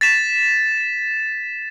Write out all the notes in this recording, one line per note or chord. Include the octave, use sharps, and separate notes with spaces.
A6 B6 E7